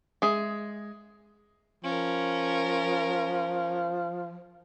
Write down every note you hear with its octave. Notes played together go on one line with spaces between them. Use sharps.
G#3 G#4 E5
F3 C#4 A#4